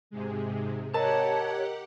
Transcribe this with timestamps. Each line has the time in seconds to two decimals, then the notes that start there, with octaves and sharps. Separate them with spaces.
0.11 G#2 C3 G#3
0.94 G4 A#4 C#5 D#5 F#5 A5 A#5